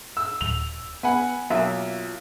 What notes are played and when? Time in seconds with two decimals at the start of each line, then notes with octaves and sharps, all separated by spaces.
0.17 E6
0.41 D#1 F7
1.03 B3 F#5 G#5 B5
1.50 B1 A#3 F4 E5